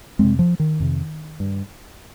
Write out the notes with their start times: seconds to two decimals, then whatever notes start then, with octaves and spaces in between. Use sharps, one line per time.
0.19 F2 C3 G#3 C4
0.39 F3
0.60 D#3
0.80 F2 C3
1.40 G2